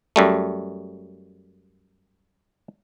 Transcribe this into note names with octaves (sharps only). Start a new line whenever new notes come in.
F#2 G3 A3